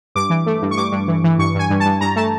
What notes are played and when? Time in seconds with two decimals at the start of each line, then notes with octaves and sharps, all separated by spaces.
0.15 G2 D6
0.30 E3
0.46 A3
0.62 G2
0.71 C#6
0.77 G2 D6
0.92 G2
1.08 E3
1.24 E3
1.39 G2 C#6
1.55 G2 G#5
1.70 G2
1.80 A5
1.85 G2
2.01 G2 A#5
2.16 A3 A5